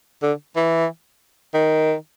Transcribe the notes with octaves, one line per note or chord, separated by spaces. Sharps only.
D3
E3
D#3